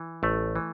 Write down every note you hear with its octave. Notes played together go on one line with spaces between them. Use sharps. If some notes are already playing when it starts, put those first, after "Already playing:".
Already playing: E3
A1 A3
E3